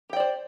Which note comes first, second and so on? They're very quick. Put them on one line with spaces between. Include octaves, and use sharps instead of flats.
G4 G5 D5 C5